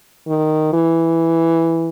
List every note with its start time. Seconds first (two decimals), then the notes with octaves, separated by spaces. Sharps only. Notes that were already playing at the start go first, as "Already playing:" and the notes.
0.27 D#3
0.73 E3